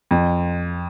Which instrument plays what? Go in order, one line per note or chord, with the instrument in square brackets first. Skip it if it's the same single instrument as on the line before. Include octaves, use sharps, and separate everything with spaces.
[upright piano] F2